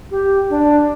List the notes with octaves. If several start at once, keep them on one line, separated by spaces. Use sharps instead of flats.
G4
D4